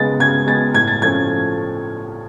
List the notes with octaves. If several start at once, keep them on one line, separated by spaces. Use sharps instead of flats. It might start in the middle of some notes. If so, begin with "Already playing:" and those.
Already playing: C#3 G#3 B3 A6
C#3 G#6
G#3 B3 A6
A2 G#6
A6
F3 A3 C#4 G#6